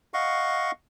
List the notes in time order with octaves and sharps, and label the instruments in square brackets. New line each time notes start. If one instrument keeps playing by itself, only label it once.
[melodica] D#5 F5 F#5 C#6